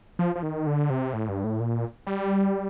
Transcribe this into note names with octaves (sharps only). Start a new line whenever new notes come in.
F3
F3
D#3
D3
C3
A2
G2
A2
A#2
G3